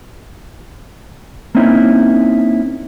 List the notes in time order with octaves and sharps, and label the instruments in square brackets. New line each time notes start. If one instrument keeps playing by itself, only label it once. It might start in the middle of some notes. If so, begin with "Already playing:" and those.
[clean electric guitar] A#3 C4 C#4 D#4 E4